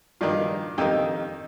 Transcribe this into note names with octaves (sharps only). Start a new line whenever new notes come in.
G2 D#3 D4 F4
F2 D#3 D#4 G4